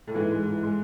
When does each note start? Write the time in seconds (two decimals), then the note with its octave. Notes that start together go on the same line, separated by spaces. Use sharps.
0.07 A2
0.14 G#2 E3
0.31 G#3
0.46 E3
0.63 G#3